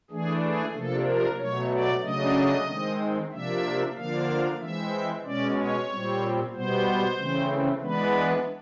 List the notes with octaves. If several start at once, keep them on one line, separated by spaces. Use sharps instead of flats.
E3 A3 D4 G#4
G#4
C3 F3 A#3 D4 A4
A#4
B2 F#3 A3 C#5
D5
C#3 F#3 A3 D4 D#5
D#3 G#3 C4
C3 F3 A#3 D4 E5
D3 F3 A#3 D4 F5
E3 G#3 C4 E5
B2 G#3 C#4 D5
C#5
A#2 G3 C4
B2 G3 B3 C5
C#3 E3 A3 C4
E3 G#3 B3 D4 B4